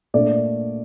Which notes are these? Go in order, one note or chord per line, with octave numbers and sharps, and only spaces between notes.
A#2 A3 D4 D5